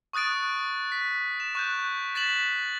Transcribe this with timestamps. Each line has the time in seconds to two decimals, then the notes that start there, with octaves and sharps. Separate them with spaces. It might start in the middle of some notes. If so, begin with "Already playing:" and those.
0.13 C#6 D#6 F#6 A6 D7
0.92 B6
1.40 E7
1.55 C#6 F#6 G6
2.15 A6 B6 E7 F#7